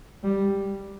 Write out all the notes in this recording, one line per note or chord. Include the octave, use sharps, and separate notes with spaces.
G3